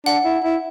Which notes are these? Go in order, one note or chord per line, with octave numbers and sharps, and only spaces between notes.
D4 F#5
E4
E4